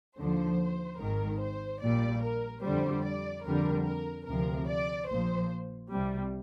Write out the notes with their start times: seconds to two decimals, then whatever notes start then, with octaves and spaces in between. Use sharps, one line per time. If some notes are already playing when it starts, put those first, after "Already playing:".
0.18 D#2 D3 F3 C5
1.00 G#1 G#2 D#3 A#4
1.41 C5
1.82 A#1 A#2 G3 D5
2.22 A#4
2.63 F2 D3 G3 C5
3.04 D5
3.45 F2 D3 G3 A#4
3.86 A#4
4.27 D2 C3 F3 A#4
4.67 D5
5.08 A#1 A#2 F3 C5
5.90 C2 C3 G3